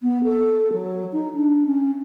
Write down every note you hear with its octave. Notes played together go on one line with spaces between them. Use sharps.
B3
A4
F#3
D#4
D4
C#4